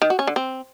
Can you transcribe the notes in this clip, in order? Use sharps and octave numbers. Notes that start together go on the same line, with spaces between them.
D#3
F#4
C#4
D3
C4